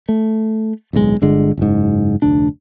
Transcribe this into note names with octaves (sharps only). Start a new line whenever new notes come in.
A3
D1 B1 B2 G#3
G1 D3 G#3
F#1 G#2
F1 D2 D4